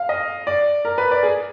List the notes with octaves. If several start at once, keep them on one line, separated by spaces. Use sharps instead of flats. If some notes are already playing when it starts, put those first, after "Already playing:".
Already playing: F5
D#5
D5
A#4
B4
D5
G#4